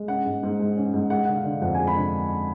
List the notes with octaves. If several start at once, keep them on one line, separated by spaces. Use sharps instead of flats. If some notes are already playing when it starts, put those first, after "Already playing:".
Already playing: G#3
C#4 F#5
G#2
G#2
G#2
C#4
G#2
G#3 F#5
D3 F#5
F5
D3
F2 F#5
G#5
G#3
B5
D3